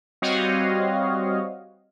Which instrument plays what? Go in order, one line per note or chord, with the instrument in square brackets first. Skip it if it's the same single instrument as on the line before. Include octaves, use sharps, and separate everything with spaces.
[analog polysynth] G3 C4 F#4 C#5 D#5 F5